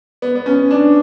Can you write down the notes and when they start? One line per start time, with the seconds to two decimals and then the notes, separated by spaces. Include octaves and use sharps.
0.22 B3
0.35 B3
0.46 C#4
0.71 D4